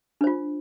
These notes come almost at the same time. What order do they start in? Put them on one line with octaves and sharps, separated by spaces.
D4 C5 F4